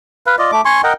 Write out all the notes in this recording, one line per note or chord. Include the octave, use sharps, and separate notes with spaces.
B4 F5
F4 D5 D#5
A3 D6
G#5 C6 C#6
A#4 D#5 F#5 G5